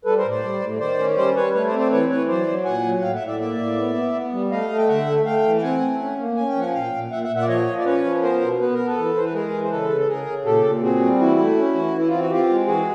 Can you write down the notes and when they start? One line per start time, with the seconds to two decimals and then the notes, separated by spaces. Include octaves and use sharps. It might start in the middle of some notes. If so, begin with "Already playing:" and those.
0.05 G3 A4 B4
0.18 A#4 C5
0.24 A2
0.30 C5 D5
0.43 G3
0.61 A2
0.80 D#3 C5 D5
0.99 C#4
1.16 G3 C5 D5
1.35 G3 B4 C#5
1.53 A3 B4 C#5
1.67 C5 D5
1.73 C4
1.79 C5 D5
1.91 E3 B4 C#5
2.09 E3 B4 C#5
2.28 F#3 C5 D5
2.47 F#3
2.65 A#2 F#5 G#5
2.84 F#3
2.99 F#5
3.02 A2 F5 G5
3.15 E5 F#5
3.21 A2
3.27 D5 E5
3.39 A#3 D5 E5
3.58 A2
3.77 B3
3.95 B3
4.14 B3
4.32 G3
4.51 A3 D#5 F5
4.69 A3
4.78 G5
4.88 D3 E5 F#5
5.07 A3
5.25 A3 F5 G5
5.44 E3
5.58 G5
5.62 C4 F#5 G#5
5.81 A3
5.99 C#4
6.19 A#3
6.36 C#4 G#5
6.48 G5
6.56 F3 F#5 G#5
6.69 F#5
6.73 A#2 F5 G5
6.92 A#2
7.11 A#2 E5 F#5
7.23 E5 F#5
7.29 A#2
7.36 E5 F#5
7.42 D5
7.48 F3 C#5 D#5
7.66 F3
7.78 D5
7.86 C#4 B4 C#5
8.04 F3
8.22 B3 A#4 C5
8.41 B2
8.59 B3 B4
8.73 A#4
8.79 B3
8.87 A4 B4
8.97 E3
9.15 E3 C5
9.25 B4
9.33 G#3 G#4 A#4
9.53 E3
9.64 C5
9.71 C#3 A4 B4
9.90 C#3
9.96 A4
10.08 C#3 G#4 A#4
10.27 C#3
10.45 A#2 G4 A4
10.63 A#2
10.82 C4 F#4 G#4
11.01 G3
11.19 E3 E4 F#4
11.38 A3
11.57 C#4
11.75 E3
11.93 E3 E4
12.08 C4 F4
12.20 F#4
12.30 C4 F4 G4
12.50 G#3
12.67 E3 F#4 G#4